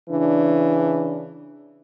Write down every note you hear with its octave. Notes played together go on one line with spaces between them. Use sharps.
C#3 E3 D4